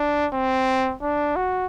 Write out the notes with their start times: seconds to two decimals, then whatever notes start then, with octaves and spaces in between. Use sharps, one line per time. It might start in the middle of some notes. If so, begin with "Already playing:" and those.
Already playing: D4
0.33 C4
1.02 D4
1.36 F#4